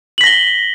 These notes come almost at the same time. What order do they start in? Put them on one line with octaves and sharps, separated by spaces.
F#7 B6 A#6 G7